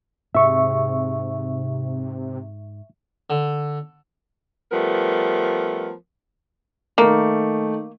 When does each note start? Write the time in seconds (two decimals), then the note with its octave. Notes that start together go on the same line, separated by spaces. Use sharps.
0.35 G#2 C3 E5 C#6
3.30 D3
4.72 F3 G3 A3 B3 A#4
6.98 D#3 A3 A#3